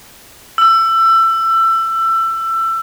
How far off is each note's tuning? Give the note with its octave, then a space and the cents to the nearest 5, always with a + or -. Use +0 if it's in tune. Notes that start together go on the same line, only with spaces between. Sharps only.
E6 +25